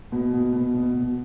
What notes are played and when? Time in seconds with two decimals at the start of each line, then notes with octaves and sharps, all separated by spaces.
0.12 B2
0.33 B2
0.53 B2
0.74 B2
0.94 B2